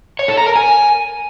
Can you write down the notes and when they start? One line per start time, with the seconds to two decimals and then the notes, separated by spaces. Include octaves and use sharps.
0.19 C#5
0.28 A4
0.37 A#5
0.47 A#4
0.56 G#5